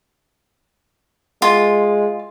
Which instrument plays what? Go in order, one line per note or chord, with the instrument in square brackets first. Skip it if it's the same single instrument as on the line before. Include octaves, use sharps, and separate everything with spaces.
[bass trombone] G#3 [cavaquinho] F4